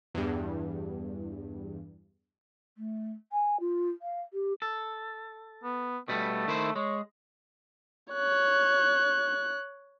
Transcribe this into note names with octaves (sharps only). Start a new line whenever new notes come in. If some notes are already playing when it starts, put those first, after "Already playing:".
E2 G2
A3
G#5
F4
F5
G4
A4
B3
B2 G3 A3 B3
D#3 E4 C5
G#3 C#5
C#5 F#6